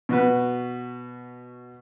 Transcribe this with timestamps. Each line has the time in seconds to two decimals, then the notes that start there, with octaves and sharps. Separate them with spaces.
0.09 B2 F#4 B4